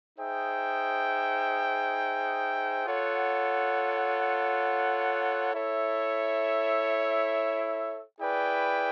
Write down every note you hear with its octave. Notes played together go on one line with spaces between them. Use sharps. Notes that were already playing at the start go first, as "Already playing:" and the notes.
D#4 G#4 C5 E5 G5
F4 A4 C#5 F#5
E4 A4 C#5 E5
E4 G#4 B4 D5 G5